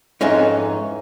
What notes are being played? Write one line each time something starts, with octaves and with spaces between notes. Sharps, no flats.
F2 G#2 E3 C#4 D#4